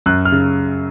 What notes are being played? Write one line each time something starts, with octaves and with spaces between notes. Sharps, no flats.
F#2 F#6
F6
C#3